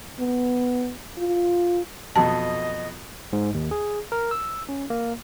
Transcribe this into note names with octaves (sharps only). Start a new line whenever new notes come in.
B3
F4
F2 B2 F#3 D#5 A5
G#2
D#2
G#4
A#4
E6
C#4
A#3